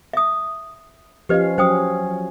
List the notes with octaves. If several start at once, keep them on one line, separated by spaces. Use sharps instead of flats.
E5 D#6
F3 C#4 G4 B4 D#5 F5
F#3 C#4 C5 G5 D#6